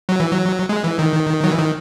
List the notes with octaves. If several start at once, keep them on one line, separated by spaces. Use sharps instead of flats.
F#3
E3
F#3
G#3
E3
D#3
F#3
E3
D#3